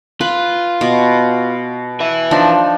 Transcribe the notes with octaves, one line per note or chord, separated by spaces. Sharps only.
F4 B4
B2
B4 E5
F3 D4 D#4